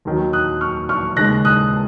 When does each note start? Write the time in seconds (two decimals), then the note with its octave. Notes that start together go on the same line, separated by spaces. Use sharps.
0.05 D#2 D#3 F#3
0.33 D#6 F#6
0.61 C#6 F6
0.89 C#6 F6
1.17 D#2 C#3 G#3 F#6 A#6
1.45 D#6 F#6